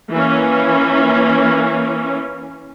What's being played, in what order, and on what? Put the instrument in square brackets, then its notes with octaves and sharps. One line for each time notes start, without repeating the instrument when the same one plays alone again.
[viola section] E3 A#3 C#4